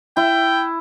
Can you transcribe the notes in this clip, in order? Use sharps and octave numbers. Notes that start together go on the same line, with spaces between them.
E4 G5